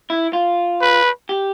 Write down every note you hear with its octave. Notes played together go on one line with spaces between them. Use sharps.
E4
F4
B4
G4